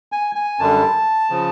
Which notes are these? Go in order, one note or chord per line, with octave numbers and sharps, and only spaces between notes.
G#5
G#5
F#2 D3 G3 A5
C#3 F3